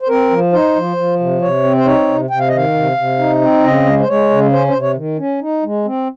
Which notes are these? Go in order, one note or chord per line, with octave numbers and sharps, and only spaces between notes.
C5
C4 A#4
F3
D#4 C5
F3
F3
C3
C3 C#5
C4
C5
D#4 C#5
C3
C3 G5
F5
D#5
D#3 F5
C3
C3
D#4
C4
C#3 D#5
G#3
C5
G#3 C#5
C#3
C#4 C5
C5
C3
C#5
D#3
C#4
D#4
G#3
C4